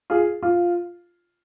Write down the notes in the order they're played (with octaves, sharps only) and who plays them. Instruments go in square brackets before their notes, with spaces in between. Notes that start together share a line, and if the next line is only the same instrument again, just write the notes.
[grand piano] F4 G#4
F4